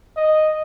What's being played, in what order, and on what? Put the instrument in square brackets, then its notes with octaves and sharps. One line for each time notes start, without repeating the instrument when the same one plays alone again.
[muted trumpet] D#5